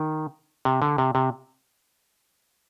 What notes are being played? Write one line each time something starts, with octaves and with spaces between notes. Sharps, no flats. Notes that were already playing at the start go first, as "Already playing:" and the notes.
Already playing: D#3
C3
D3
C3
C3